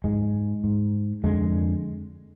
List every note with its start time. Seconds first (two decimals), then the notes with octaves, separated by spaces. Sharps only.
0.04 G#2 G#3
0.64 G#2
1.24 F2 D3 G#3